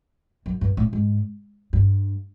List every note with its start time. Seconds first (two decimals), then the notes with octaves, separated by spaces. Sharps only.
0.46 F#2
0.61 G2
0.77 A2
0.93 G#2
1.73 G2